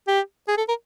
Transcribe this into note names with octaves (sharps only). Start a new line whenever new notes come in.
G4
G#4
A4
A#4